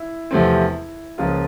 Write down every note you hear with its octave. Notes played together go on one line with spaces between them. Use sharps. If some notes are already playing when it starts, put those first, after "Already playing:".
Already playing: E4
E2 C3 F3 A3 C4
C#2 C#3 F3 A#3 F4